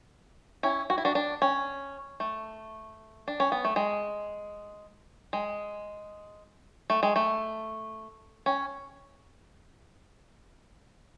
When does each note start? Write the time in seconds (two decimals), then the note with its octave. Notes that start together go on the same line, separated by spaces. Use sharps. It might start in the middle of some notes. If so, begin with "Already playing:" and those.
0.63 C#4 E4
0.90 F#4
0.98 E4
1.05 D4 F#4
1.15 D4
1.42 C#4
2.20 A3
3.28 D4
3.40 C#4
3.52 B3
3.64 A3
3.76 G#3
5.33 G#3
6.90 A3
7.03 G#3
7.16 A3
8.46 C#4